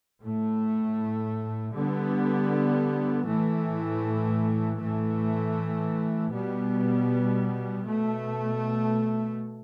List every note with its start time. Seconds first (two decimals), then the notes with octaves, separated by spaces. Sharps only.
0.22 A2 A3
1.75 D3 G3 B3
3.27 A2 E3 A3
4.80 A2 E3 A3
6.32 B2 G3 B3
7.84 B2 A3